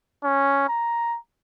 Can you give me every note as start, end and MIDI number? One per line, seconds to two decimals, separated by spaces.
0.24 0.67 61
0.69 1.17 82